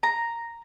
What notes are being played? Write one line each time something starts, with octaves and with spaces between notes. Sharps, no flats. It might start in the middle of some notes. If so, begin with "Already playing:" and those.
A#5